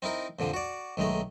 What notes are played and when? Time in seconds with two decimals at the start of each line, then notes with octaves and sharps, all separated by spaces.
0.02 C4 D#4 E4 A#4
0.39 F2 A#2 D3 F3
0.54 F#4 D5
0.97 B1 D#3 G#3 A3 A#5